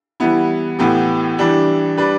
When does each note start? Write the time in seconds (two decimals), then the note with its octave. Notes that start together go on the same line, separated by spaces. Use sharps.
0.20 E3 G3 B3 E4
0.79 A2 E3 B3 G4
1.38 E3 G3 D4 G4
1.97 G3 D4 B4